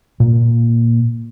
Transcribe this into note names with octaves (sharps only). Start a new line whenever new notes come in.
A#2 A#3